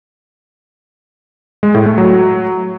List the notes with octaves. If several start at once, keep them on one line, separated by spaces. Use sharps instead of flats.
G#3
A2
A3
F#3